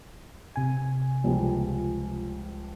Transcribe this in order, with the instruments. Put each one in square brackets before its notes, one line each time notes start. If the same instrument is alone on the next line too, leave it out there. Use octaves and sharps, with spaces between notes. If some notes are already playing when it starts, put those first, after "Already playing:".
[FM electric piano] C3 G#5
[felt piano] C#2 F3 G3